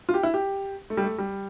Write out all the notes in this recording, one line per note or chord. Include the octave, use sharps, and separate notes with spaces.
F4
G4
E4
G4
A3
G3
A3
G3